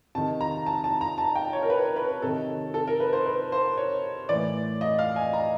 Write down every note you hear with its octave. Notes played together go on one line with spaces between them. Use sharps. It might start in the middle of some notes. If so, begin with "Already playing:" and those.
C3 D#3 A5
A#5
A5
A5
A#5
A5
G5
C#5
A#4
B4
B4
C3 D#3 A4
A4
A#4
B4
C5
B4
C5
C#5
A2 E3 D5
D#5
F5
G#5
A#5